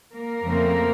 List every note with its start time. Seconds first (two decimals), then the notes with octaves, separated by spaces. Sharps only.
0.13 A#3 A#4
0.42 F2 C#3 A3 C4